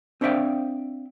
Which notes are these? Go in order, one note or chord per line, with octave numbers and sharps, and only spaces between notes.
C4 D4 C5 E5 F5 G5